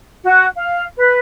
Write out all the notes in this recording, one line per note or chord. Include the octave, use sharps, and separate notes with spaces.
F#4
F5
B4